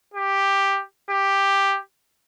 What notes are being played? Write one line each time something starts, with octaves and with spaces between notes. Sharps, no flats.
G4
G4